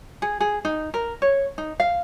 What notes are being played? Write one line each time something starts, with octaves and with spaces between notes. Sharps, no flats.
G#4
G#4
D#4
A#4
C#5
D#4
F5